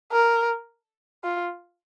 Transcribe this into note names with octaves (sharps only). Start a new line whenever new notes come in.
A#4
F4